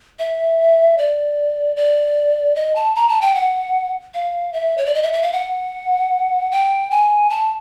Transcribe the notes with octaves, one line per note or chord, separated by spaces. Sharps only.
E5
D5
D5
D#5
A5
A#5
A5
G5
F#5
F5
E5
C#5
D5
D#5
E5
E5
F5
F#5
G5
G#5
A5